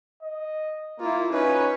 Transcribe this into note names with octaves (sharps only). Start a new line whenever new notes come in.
D#5
A#3 E4 F4
C#4 D#4 B4